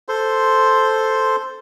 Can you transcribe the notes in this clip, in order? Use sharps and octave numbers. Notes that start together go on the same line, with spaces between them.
A4 C5 C6